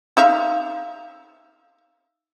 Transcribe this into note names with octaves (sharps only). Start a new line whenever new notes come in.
D#4 E5 F5